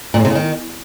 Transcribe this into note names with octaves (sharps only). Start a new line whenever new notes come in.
A#2
A2
C3
C#3
D#3